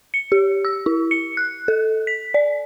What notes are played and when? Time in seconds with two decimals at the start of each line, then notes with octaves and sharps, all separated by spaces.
0.14 C#7
0.32 G4
0.65 E6
0.86 E4
1.11 C#7
1.37 F#6
1.68 A4
2.07 B6
2.34 D5